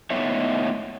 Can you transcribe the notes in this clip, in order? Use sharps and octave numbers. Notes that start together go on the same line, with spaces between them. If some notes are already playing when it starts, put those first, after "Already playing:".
A2 B3 D#4 C#5 E5